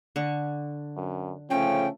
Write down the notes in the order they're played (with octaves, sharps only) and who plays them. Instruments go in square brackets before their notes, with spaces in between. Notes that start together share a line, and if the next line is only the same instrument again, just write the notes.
[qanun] D3 C#6
[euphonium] F#2
[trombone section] C#3 F3 A3 [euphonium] C#4 [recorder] G5